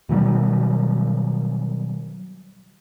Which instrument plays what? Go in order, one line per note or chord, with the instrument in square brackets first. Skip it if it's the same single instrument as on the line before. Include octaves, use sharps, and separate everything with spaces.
[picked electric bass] B2 D#3 F#3 G3